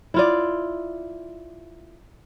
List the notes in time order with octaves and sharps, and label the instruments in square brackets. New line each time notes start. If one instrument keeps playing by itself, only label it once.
[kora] E4 F4 D5